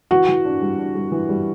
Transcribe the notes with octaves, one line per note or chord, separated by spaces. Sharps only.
E3 F#4
E3
D4
G3
D4
G3
E3
G3